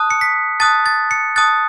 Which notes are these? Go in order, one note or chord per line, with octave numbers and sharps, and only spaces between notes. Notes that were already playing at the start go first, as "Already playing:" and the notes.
Already playing: A5 D#6 F#6
C#7
B6
A5 D#6 F#6 A6
A6
C#7
A5 D#6 F#6 A6